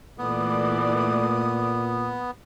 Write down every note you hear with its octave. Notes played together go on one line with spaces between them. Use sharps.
A#2 E3 A3 B3 D5 D#6